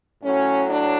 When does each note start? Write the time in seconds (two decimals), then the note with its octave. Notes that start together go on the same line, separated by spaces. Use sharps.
0.24 A2 F#3 C#4
0.69 D4